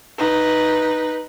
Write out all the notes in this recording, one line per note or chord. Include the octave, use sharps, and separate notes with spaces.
D#4 B4